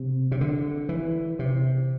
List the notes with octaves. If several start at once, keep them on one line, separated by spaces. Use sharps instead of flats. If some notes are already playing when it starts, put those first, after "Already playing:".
Already playing: C3
C3
D3
E3
C3